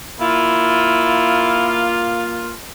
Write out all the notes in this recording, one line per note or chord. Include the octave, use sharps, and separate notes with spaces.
A#3 E4 F4